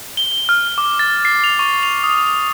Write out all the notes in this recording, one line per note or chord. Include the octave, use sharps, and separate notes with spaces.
G7
F6
D6
A6
C7
F7
C#6
F7
D#6